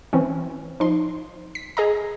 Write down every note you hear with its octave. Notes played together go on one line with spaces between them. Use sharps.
E3 C4 C#4
F3 D#4 C6
B6
G#4 D#5 A#5